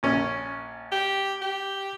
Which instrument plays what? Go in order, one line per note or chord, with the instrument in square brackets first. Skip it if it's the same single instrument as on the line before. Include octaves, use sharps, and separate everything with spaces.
[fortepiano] A#1 C#4
[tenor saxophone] G4
G4